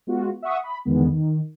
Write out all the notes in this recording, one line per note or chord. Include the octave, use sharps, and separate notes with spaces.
G#3 B3 F4 F#4
E5 F#5 C#6 D#6
B5
E2 D3 D#3 G#3 B3
D#3